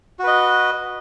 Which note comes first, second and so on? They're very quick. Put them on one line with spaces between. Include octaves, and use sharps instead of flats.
F#4 B4 D#5